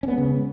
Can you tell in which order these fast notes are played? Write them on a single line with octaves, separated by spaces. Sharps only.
C#4 B3 G#3 C#3